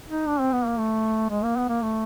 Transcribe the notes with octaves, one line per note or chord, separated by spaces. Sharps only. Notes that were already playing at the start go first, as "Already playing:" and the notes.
D#4
D4
C4
B3
A#3
A3
G#3
A#3
B3
A#3
A3